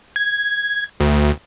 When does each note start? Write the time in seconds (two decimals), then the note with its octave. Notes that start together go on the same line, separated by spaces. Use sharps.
0.16 G#6
1.00 D2